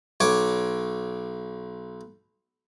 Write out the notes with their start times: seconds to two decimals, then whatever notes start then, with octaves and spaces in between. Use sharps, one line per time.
0.20 B1 C#5 D6